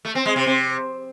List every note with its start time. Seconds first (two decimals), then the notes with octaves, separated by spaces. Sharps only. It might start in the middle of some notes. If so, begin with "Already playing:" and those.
0.05 A3
0.15 C4
0.26 G#3
0.36 C3
0.46 C3